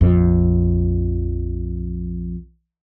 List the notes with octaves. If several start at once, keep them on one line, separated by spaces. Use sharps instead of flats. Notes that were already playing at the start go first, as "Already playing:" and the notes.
A#1 F2